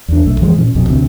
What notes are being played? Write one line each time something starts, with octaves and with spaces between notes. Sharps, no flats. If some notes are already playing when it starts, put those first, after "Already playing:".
E2 D4
B1 A3
F#2 E3 F3 G#3
A#2 C4 C#4
B1 F2 B2
D2 C3 C4